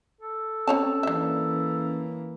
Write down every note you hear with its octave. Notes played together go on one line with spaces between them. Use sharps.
A4
C4 C#4 C#5 A5
E3 A#3 D4 E5